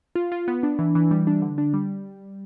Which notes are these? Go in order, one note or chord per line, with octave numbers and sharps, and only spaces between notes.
F4
F4
B3
D4
E3
E3
G3
D4
D3
D4
G3